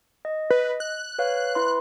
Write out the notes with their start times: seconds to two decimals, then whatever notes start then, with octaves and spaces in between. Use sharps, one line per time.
0.25 D#5
0.50 B4
0.80 F#6
1.19 B4 C#5 F5
1.55 E4 B4 C6